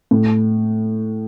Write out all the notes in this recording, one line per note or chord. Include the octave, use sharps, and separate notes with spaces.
A2